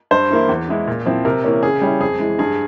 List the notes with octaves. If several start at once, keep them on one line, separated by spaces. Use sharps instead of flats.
G2 C5
E3 A#3 E4
E2
E3 G#3 E4
A#2
F3 C4 E4
C3 A#4
E3 A#3 C#4
C#3 G#4
G3 C#4 E4
F2 G#4
E3 G#3
G2 G#4